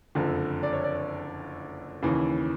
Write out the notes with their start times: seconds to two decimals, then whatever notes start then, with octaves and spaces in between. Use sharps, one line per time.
0.15 F#1 F2 D3
0.63 D5
0.73 C#5
0.84 D5
2.02 D#2 C#3 E3